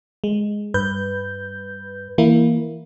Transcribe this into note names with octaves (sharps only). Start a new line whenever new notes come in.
G#3
G2 B4 G6
E3 A#3 E4